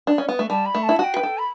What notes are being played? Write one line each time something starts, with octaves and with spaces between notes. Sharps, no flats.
D4
C#4
B3
A3
G3 A5
B5
A3
A5
E4
F#4 G5 A5
B4
A4
B5